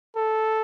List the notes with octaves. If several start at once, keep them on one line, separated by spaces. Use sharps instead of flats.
A4